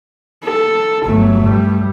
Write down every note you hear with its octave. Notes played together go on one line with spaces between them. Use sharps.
A4
G1 F#3 A3
G2 G3